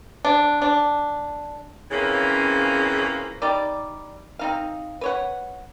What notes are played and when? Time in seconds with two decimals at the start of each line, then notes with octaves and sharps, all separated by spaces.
0.25 D4
0.62 D4
1.91 C#3 E3 F3 A#3 C4 C#4
3.42 G3 D#4 D5
4.39 C4 D#4 F5
5.01 B4 C#5 F#5